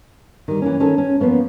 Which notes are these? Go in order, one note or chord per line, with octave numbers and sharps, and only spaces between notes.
D#3 G3
E3 A#3 C#4
D#3 C#4 A4
C#4
F3 A#3 B3 C#4